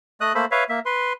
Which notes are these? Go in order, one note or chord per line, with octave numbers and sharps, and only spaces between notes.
A3 D#5 D#6 F#6
A3 A#3 A4 C5 B5
B4 C#5 E5 F5
A#3 E5
B4 C6